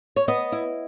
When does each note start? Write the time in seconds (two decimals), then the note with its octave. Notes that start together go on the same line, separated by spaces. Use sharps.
0.16 C#5
0.28 B3 D#5
0.52 E4